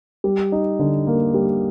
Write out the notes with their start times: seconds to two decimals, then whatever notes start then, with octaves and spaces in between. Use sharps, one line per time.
0.24 G3
0.52 D#4
0.79 D3
1.07 A#3
1.34 G3